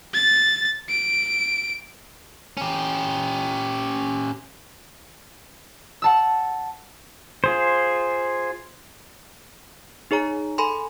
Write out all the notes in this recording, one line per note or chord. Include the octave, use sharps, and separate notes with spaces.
A6
D7
C#4 G4
F#5 A5 E6
F4 G#4 C5
D#4 G#4 C#5 A#5
A4 G#5 B5 C6